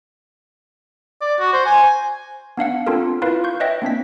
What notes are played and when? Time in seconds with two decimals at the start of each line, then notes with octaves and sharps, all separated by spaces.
1.21 D5
1.39 F#4
1.53 C5
1.66 G#5
2.57 B3 D4 F5 F#5
2.87 C4 D4 F4 A4 A#4
3.22 E4 F4 A#4 B4 F5
3.44 C#6 G6
3.60 B4 C#5 D#5 E5 G5
3.82 A#3 C4 D4 B6